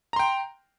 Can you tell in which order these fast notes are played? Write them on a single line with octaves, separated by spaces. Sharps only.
A#5 C6 G5